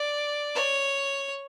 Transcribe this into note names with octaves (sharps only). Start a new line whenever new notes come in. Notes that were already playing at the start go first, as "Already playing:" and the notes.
Already playing: D5
C#5